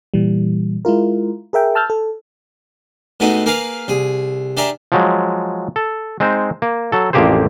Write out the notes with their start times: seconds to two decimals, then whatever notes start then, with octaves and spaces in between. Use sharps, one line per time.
0.14 A#2 E3 G3
0.85 G#3 E4 F4 A#4
1.53 G#4 A#4 E5 G5
1.75 A5 E6 F6 G6 A6
1.90 A4
3.20 A2 G#3 B3 D#4 F#4
3.46 A#3 G#4 A#4 B4 F5
3.88 C2 G#4
4.57 D4 G4 G#4 A#4 E5
4.92 F3 F#3 G#3
5.76 A4
6.20 G#3 C4 D#4 C5
6.62 A#3
6.92 F#3 A4
7.13 A1 F2 A#3 G4 G#4 C5